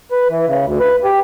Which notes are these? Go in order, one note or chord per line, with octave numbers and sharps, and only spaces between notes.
B4
E3
C#3
D2
B4
G4